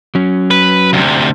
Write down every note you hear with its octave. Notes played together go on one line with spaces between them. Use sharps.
F#3 C#4
B4
D2 C3